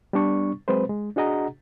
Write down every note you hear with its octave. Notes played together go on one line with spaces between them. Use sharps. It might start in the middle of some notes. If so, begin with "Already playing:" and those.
G3 B3 D4 C#6
F#3 G#3 C4 B4 C5
G#3
D4 F#4 G#4 D#5 F#5 A#5